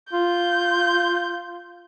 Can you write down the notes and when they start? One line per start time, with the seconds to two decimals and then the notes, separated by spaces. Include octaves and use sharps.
0.13 F4 G6